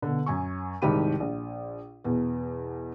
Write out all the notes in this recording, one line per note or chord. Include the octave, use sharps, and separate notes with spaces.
B2 D3
F#2 G#5 C#6
C2 G#2 D#3 G4 B5 D#7
A#1
E2 B2 B4